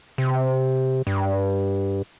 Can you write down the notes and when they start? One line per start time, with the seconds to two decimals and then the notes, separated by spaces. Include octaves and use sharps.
0.18 C3
1.07 G2